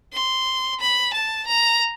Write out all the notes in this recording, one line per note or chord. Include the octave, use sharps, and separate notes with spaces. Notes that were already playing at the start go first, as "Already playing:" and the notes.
C6
B5
A5
A#5